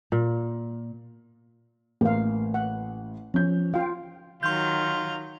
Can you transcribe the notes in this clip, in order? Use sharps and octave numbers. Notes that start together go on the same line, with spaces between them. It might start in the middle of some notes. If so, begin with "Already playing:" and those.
A#2
A1 A#3 F5
F#5
F3 C#4 G6
F4 F5 G5
D#3 F#3 F4 C6 G6